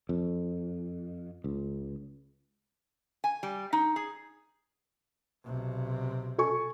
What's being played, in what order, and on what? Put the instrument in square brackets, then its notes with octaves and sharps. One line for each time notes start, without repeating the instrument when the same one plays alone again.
[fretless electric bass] F2
C#2
[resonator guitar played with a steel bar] G#5
G3
D#4
G#4
[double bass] B1 C3
[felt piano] A4 G#5 C#6